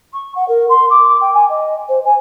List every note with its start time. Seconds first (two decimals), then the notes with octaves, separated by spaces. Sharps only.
0.13 C#6
0.35 F#5
0.48 A#4
0.69 C6
0.90 D6
1.21 G5
1.33 G#5
1.49 D#5
1.88 C5
2.04 G#5